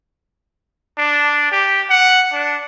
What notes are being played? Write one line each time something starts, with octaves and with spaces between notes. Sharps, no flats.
D4
G4
F#5
D4